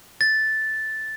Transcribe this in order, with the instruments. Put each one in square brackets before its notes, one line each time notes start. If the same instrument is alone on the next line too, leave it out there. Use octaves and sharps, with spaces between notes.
[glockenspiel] A6